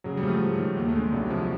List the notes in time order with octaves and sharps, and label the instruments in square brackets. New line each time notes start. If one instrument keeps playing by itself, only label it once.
[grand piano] C#3 [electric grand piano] F#3
[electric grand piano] G3
[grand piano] F3
[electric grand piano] A3
[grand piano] G#2
D#3
D#2
[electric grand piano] A3
[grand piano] D3 [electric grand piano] G#3
[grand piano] C2 [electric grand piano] F#3
[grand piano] C3 [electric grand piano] F3